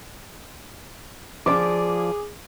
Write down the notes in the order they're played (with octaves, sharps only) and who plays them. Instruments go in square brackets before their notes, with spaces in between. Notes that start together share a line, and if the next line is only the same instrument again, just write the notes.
[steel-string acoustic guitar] F3 D5 [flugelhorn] G#4 [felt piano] D6